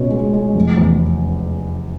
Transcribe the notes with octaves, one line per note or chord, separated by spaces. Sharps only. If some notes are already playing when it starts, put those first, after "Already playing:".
Already playing: C#2 B2 G#3 C#5
G#3
G#3
F1
E2